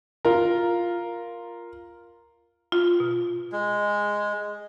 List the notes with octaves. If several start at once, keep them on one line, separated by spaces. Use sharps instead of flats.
F4 A#4
F4
B2
G#3